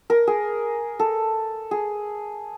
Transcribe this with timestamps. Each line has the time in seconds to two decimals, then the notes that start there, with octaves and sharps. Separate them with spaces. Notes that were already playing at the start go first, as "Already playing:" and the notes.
0.10 A#4
0.27 G#4
0.99 A4
1.71 G#4